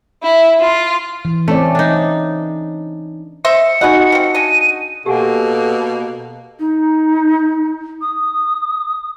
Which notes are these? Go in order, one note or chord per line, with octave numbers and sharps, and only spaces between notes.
E4
F4
E3
A3 C4 C#4 D5
D4 D#4
C5 D#5 E5 C#7
D#4 F#4 G#4 B4 F#5
F3 C4
G#3 D4 D#7
B2 A#3 G4 A4 F#5 G#5
D#4
D#6